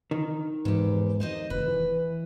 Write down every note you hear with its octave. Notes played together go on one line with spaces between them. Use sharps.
D#3
E2 G#2 G4
D#4 C5 D#5
F1 B4
E3